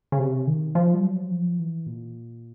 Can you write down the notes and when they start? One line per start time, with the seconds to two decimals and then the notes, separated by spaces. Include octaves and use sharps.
0.12 C#3
0.19 C3
0.47 D#3
0.75 F3
0.94 G3
1.03 F#3
1.31 F3
1.59 E3
1.86 A#2